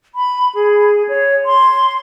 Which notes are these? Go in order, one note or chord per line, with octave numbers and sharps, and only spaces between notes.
B5
G#4
C#5
C6